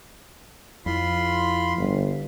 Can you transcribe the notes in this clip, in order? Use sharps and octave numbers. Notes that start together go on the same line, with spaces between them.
F2 E4 F4 B5 C6
G1